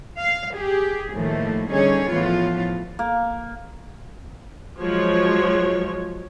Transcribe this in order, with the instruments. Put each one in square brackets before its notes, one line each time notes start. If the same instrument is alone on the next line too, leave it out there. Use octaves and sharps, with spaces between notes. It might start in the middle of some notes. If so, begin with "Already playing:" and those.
[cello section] F5
G4 G#4
A2 D#3 F3 A3 A#3
D3 G3 C#4 D#4 G#4 C#5
A2 E3 F3 B3 F4
[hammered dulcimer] A#3
[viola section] F3 F#3 G#3 C#5